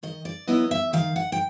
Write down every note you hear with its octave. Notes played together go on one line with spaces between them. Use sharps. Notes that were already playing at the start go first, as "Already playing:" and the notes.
D#3 D#5
D5
F#3 B3 E4 D#5
E5
D#3 F5
F#5
G5